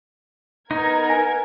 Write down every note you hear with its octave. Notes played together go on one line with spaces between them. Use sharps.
B3 D#4 A#4 G#6
G#5